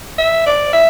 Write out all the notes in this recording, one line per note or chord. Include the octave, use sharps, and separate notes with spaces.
E5
D5
E5